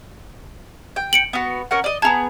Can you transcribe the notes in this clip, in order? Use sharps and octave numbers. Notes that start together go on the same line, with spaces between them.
G5
C#7 D7 F#7
B3 F#4
C#4 A#4 F#5
D5 D#5
B3 E4 G#4 A5 A#5